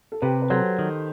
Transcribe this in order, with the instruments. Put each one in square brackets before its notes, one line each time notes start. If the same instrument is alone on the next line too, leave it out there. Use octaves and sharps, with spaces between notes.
[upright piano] A4
[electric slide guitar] C3 [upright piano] G4 B4
[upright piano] B4
[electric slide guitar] F#3 [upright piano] A4 C5
[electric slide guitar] D#3